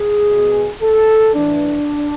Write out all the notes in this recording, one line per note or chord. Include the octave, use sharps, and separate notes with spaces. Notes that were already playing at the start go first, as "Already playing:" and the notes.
Already playing: G#4
B2
A4
A2 E3 D4